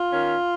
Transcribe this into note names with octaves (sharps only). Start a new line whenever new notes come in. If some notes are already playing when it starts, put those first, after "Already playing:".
Already playing: F4
D#3 C#4